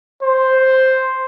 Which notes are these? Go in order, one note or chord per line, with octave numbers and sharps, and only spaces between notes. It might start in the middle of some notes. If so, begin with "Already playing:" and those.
C5